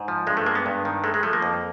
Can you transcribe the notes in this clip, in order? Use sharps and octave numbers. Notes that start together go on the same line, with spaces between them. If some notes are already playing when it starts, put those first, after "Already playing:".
Already playing: G#2
F3
G2 G#3
A3
G#3 A#3
B3
G2
D#3
G#3 A3
G#3
F3 A3
A#3
F2